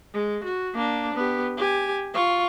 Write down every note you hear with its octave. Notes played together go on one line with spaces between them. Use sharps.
G#3
F#4
A#3 D4
B3 G4
G4 G#5
F4 C#6